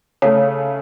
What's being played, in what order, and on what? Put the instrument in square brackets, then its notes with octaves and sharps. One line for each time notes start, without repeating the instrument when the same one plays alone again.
[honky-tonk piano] C#3 A3 [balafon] C#5